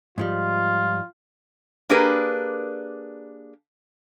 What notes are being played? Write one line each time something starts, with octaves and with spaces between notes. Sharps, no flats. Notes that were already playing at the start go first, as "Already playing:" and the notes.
G#2 F3 G3 F4
A#3 D4 G4 G#4 A#4 B4